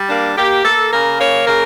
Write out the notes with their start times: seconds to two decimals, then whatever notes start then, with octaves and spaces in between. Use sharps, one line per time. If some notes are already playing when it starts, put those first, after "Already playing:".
Already playing: G3
0.10 A#3 D4
0.37 A#3 G4
0.65 A#3 A4
0.92 C#3 A#4
1.20 A#3 C#5
1.47 C#3 A#4